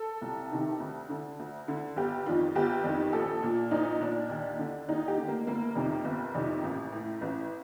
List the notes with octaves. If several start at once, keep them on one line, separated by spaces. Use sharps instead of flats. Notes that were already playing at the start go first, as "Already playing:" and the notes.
Already playing: A4
C2
C3 D#3
D2
D3
D2
D3
G1 G4
F2 D#3 F4
G1 G4
F2 D#3
A#1 A4
A#2 F4
A#1 D#4
A#2 D4
D#2
D3
D#2 D#4
G4
D3
A#3
G1 A#3
F2 C3 D#3
G1
F2 C3 D#3
A1
A2
A1